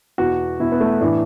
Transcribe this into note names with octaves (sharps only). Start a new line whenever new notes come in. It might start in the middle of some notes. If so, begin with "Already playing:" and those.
E2 B2 F#4
E2 B2 E4
B3
A3
A2 E3 D4